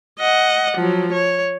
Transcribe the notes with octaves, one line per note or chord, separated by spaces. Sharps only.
D#5 F#5
F3 F#3
C#5